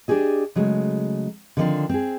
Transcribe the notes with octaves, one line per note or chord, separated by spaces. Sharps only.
D4 D#4 G4 G#4 D#5
C#3 F#3 G#3 A3
D3 D#3 F3 G3 C4 D4
C4 G#4